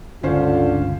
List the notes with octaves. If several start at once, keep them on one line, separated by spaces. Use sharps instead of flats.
G1 C#2 G2 D3 C#4 F4 C5 F5